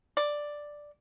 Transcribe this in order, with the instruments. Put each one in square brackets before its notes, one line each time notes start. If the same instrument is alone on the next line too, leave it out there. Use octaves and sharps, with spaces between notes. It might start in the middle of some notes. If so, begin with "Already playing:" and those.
[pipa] D5